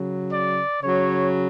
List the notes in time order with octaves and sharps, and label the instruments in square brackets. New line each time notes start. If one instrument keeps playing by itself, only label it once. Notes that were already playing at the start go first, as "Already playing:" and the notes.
Already playing: [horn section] C#3 F#3
D5
C#3 F#3 C#5